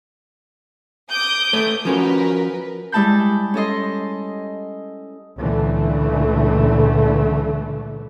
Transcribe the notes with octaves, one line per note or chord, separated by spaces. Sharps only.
D6 D#6 G6
A3 B4 C#5
F3 C#4 F#4 A#4 B4
G3 G#3 E4 A5 B5 G6
C#4 A4 D#5 C6
C#2 A#2 D3 E3 A3